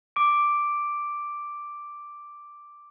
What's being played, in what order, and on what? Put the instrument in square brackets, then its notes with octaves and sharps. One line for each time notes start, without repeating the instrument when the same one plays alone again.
[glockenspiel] D6 D7